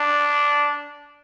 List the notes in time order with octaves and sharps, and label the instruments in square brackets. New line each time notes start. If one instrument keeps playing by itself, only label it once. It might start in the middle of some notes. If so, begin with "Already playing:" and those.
Already playing: [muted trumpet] D4